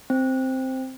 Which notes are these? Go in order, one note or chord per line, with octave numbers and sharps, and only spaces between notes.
C4